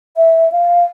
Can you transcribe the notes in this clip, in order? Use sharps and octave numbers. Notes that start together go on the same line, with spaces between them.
E5
F5